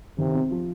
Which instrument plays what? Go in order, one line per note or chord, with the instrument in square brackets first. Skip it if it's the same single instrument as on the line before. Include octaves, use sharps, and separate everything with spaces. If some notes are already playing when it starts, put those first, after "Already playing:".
[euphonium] C3 [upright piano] D#3
[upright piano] C4
F3